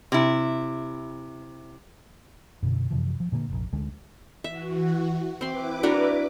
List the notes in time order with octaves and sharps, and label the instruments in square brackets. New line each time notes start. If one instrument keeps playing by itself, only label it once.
[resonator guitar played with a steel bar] C3 E4
[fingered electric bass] F#2 B2 D3
F#2 C3 E3 F3
F3
A#2 D3 A#3
F1 A#1
D2 D3 G#3
[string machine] E3 F#4 [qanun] E5
[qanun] C4 C6 [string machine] E4 B4 D6
[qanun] D4 F#4 A#4